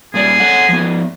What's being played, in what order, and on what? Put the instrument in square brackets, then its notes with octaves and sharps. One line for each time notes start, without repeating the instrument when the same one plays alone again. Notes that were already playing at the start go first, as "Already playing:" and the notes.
[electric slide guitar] A#2 G3 D5 [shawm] G#4
[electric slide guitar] A4 C#5 F#5
F3 B3